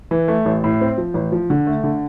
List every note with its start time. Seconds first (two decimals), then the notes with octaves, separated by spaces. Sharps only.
0.11 E3
0.28 A3
0.46 A1
0.64 A2
0.81 C4
0.98 F3
1.14 A1
1.32 F3
1.50 D3
1.67 A3
1.84 D3